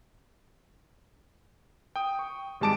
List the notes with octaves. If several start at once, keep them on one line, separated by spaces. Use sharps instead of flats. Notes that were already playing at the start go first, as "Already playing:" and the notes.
G5 D#6
C#6
G#1 G3 G#3 A5 D6 D7